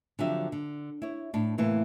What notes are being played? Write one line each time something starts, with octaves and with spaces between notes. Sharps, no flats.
D3 F3 F#3 C4 G4 E5
D3
E4 C#5
A2 D4
A2 C3 E3 A3 A#3